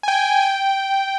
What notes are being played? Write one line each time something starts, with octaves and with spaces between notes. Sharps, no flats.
G#5
G5
G5
G5